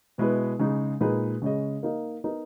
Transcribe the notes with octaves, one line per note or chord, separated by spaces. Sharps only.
B2 G#3 B3 E4 B4
C#3 G#3 D#4
A#2 G#3 D#4 G#4 B4
C#3 G#3 C#4 G#4 D#5
A#3 D#4 A#4 D#5
B3 D#4 A#4 D#5